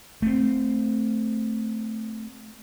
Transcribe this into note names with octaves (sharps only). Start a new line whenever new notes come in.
A3 C4